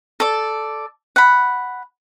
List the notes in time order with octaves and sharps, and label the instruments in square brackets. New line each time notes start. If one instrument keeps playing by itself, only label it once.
[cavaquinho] A4 D5
F#5 B5